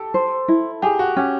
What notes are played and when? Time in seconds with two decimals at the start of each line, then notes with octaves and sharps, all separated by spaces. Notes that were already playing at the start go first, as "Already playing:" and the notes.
Already playing: G4 A4
0.14 C5
0.48 E4
0.82 G4 G#4
0.99 F#4
1.17 C#4 G4